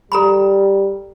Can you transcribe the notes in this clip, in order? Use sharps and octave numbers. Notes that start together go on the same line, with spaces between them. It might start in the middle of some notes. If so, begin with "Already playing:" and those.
G3 A4 A#5 B5